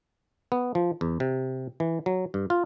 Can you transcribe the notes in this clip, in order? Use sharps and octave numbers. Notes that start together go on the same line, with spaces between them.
B3
F3
E2
C3
E3
F#3
G2
F4